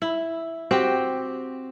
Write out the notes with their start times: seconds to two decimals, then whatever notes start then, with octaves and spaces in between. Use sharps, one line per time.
0.02 E4
0.71 C4 F#4 G4